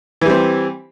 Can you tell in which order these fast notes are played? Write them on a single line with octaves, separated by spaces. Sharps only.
E3 G3 C4